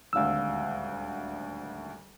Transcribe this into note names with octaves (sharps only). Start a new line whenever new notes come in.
D#1 G#1 D2 F5 E6